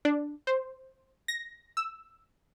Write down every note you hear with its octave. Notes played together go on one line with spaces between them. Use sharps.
D4
C5
A#6
E6